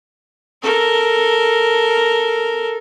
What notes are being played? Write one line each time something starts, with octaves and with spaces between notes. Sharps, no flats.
A4 A#4